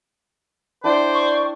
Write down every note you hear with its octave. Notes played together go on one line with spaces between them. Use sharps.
D4 E4 C5 D5 G5
C#6